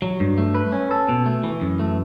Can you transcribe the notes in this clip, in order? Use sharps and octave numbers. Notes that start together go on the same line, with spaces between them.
F#3
G2
A3
B4
C#4
A4
B2
A3
E3
F#2
A3